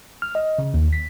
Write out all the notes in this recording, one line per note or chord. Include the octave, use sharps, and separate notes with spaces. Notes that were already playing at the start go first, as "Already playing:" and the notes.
F6
D#5
C#3
D#2
B6